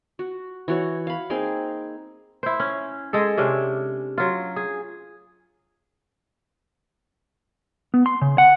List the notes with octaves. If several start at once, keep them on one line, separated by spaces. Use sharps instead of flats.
F#4
E3 F#4 C#5
F5 B5
A#3 C4 D#4 G#4
E4 C5
C#4
G#3 G#4 A4
C3 C#4 D4
F#3 F4
G#4
B3
C6
C#3
F#5